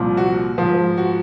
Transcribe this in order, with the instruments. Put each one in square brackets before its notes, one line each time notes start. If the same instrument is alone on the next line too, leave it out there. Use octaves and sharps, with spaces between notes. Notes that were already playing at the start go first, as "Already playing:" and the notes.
Already playing: [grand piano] C2 A#2 F3
F#4
G#2 F3
F#4